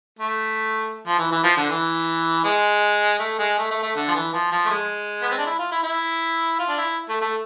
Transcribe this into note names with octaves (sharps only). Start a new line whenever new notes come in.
A3
F3
E3
E3
F3
D3
E3
G#3
A3
G#3
A3
A3
A3
D3
F3
E3
F3
F3
A3
G#3
B3
C4
D4
E4
F4
E4
E4
F4
D4
E4
A3
A3